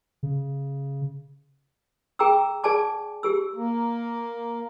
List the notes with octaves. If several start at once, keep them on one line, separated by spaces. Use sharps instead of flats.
C#3
G#4 G5 A#5 D6 E6
G#4 D5 G#5 A5 D6
G4 G#4 E6
A#3